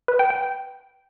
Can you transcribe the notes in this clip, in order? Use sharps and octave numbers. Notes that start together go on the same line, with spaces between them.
B4
G5
G5